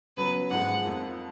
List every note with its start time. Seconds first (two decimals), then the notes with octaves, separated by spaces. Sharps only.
0.17 C#3 F#3 B3 B4
0.50 G#1 G#2 F3 G#3 F#5
0.84 F2 F3 A#3